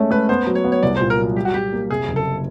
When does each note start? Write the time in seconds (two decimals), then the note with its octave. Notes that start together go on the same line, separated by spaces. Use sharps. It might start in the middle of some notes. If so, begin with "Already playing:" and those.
Already playing: G#3 A3 C#4
0.11 A3 B4
0.29 B3 C5
0.47 F#3
0.55 C#5
0.64 B3
0.72 C#5
0.83 C2 D5
0.97 C5
1.01 A#2
1.10 A#4
1.19 F#3
1.36 G3 G4
1.45 F#4
1.54 G3 G4
1.73 A#3
1.90 C3 G#4
2.08 F#1
2.16 A4